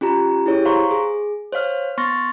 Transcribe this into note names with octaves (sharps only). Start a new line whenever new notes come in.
C#4 F4 G4 A#5
E4 G4 G#4 C#5
C5 F5 A#5 C6 C#6
G#4
C5 C#5 F5 F6
B3 C6 C#6 F6 A6 A#6